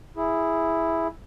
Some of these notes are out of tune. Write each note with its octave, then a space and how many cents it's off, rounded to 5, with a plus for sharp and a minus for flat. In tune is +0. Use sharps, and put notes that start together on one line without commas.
E4 +0 G#4 +0